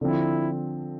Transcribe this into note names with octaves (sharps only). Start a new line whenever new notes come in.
D3 F3 C4 E4